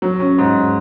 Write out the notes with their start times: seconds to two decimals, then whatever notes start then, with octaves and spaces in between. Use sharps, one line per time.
0.02 F#3
0.20 C#4
0.38 G#2